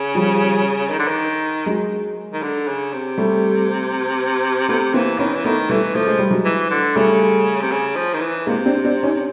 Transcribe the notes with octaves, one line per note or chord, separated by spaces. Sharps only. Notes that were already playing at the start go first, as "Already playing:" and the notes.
Already playing: C#3
F3 G3
D#3
D3
D#3
F#3 G#3
D#3
D3
C#3
C3
G3 A3
C3 A3 B3
E3 A#3 C4
D#3 B3 C#4
E3
D#3 A3 B3
E3 G3 A3
F3 A3
G#3
G3
F#3 G#3
E3
D3
C#3 G3 A3
C3
C#3
F3
D#3
E3
C3 G#3 A#3
C4 D4
C4 D4
C#4 D#4